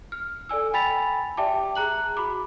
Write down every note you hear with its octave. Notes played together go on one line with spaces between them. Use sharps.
F6
A4 D5 G#5 E6
G5 G#5 B5 A6 B6 F7
G4 D5 E5 G5 A5 D6
G#4 A#5 F#6 F#7
F#4 B5 D6